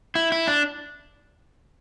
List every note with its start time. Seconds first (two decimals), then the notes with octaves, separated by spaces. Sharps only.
0.15 E4
0.32 E4
0.47 D4